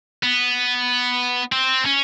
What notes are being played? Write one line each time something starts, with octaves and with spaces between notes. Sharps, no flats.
B3
C4
C#4